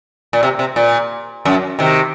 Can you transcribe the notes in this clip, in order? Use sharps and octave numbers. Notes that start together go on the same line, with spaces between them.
A#2
C3
C3
A#2
F#2
C3 D#3